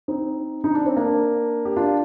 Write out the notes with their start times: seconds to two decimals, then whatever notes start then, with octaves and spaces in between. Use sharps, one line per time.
0.08 C4 D#4
0.64 D#4
0.75 D4
0.86 C4
0.96 A#3 D4
1.65 G4
1.76 D4 F4